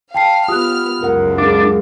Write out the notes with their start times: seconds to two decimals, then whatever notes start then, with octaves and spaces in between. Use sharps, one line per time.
0.14 F5 G5 A5 C7
0.48 B3 F4 G4 D#6 F6 F#6
1.02 C#2 F#2 A#4 F#5
1.38 D4 G#4 F5